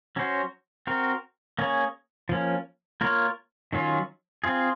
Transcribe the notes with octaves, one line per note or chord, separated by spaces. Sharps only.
F#3 C#4 F#4 C5
C4 F#4 A#4
A#3 C#4 G#4 C#5
F3 A#3 C#4
A#3 F4 A#4 C#5
D#3 F#3 C#4 F4
C4 F4 G#4